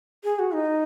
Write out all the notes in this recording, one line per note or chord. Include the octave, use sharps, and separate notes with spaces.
G#4
F#4
D#4